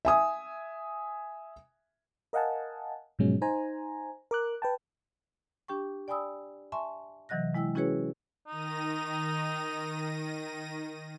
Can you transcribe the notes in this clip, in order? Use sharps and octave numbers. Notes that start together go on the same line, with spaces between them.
E5 G#5 D#6
A#4 D#5 F5 F#5 G#5 A5
G#2 B2 F3 F#3 G#3 C#4
D#4 C5 G#5 A#5
A#4 D6 F#6
B4 G5 A5
D4 G4 G5 C#6
D5 G5 G#5 B5 D#6 E6
E5 G#5 A5 C6 C#6
C3 E3 F#3 D#5 F#6 A#6
G#3 E4 G5 E6
C#4 E4 F#4 G#4 B4 C#5
D#3 D#4 A#6 D#7